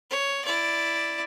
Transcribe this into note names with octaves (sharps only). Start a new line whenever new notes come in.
C#5
E4 D5